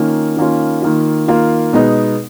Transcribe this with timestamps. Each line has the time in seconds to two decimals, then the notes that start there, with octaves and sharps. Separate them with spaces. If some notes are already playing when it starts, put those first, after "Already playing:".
Already playing: D#3 A#3 C#4 F4
0.37 D#3 A#3 C#4 F4
0.82 D#3 A#3 F4
1.28 D#3 A#3 F4
1.73 B2 G#3 B3 D#4